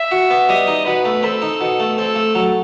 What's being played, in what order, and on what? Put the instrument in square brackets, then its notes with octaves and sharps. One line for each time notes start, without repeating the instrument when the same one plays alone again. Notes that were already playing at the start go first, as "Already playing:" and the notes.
Already playing: [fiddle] E5
[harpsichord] F#4
B3
[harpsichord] G3 [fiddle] D#5
[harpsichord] D#4
[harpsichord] B2 [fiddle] B4
[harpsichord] A3
[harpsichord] C4 [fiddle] A4
[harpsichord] D#4
B2
A3
[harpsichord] C4 [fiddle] A4
[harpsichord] A3
F#3